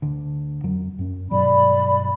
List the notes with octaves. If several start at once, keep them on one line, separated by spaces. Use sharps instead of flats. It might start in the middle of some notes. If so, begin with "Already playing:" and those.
D2 D3
F2 F#3
F#2 C#4
G2 B2 F#3 D5 B5